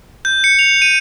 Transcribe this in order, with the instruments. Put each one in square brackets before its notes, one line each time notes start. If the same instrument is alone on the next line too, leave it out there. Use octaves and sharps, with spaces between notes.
[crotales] G6
C#7
F7
D#7